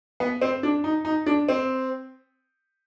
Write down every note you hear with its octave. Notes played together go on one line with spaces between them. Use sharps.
B3
C4
D4
D#4
D#4
D4
C4